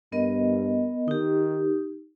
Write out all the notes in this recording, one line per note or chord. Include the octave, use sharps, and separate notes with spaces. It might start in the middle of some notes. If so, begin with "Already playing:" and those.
G2 B3 A#4 D#5
D#3 D#4 G4